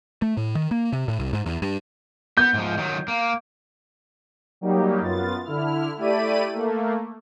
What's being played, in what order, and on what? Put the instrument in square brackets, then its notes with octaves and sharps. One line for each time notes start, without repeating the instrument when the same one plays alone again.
[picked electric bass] A3
A2
D#3
A#3
C3
A2
C2
G#2
E2
G2
[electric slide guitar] B3 [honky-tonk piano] G6
[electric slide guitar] G#2 F3
D#3 F#3
A#3
[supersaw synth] F#3 G3 A#3 D#4 G4
F#2 B3 F4 A6
D3 E4 F6
A3 E4 G4 D5 B5 D#7
A3 A#3